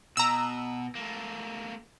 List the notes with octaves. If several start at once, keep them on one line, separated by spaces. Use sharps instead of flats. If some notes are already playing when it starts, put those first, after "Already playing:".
B2 A#5 E6
A3 A#3